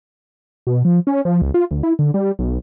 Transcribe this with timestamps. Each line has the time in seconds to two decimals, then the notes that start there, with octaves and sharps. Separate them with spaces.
0.67 B2
0.85 F3
1.07 C#4
1.25 F3
1.42 C#2
1.54 F4
1.71 D2
1.83 E4
1.99 D3
2.14 G3
2.39 B1